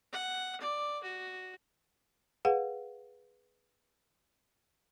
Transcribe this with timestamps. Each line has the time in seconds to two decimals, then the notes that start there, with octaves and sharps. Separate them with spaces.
0.12 F#5
0.61 D5
1.03 F#4
2.45 G#4 B4 F5 F#5